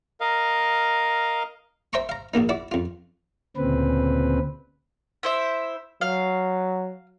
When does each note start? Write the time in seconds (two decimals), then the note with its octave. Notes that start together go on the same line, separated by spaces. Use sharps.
0.21 A#4 D#5 F5
1.93 C5 E5 G5 A#5 C6 C#6
2.09 F5 A#5
2.34 A#1 A#2 A#3 D#4
2.49 E4 F#4 D5
2.71 F2 F4
3.57 D2 A#2 C#3 C4 B4
5.23 E4 C5 E5
6.01 F#3 F5